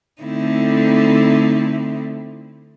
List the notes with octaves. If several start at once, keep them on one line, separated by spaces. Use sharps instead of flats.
D3 A3 C4 D#4 E4